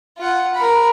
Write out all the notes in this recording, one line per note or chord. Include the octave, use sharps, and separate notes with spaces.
F4 F#5
A#4 B5